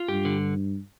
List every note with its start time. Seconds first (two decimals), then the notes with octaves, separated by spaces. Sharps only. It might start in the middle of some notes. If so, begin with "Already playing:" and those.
Already playing: F4
0.08 G2 G4
0.25 D3